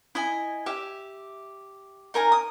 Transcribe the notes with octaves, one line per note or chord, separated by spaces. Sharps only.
E4 D#5 G#5
G4 E5
D#4 A#4 G#5 A#5
D#6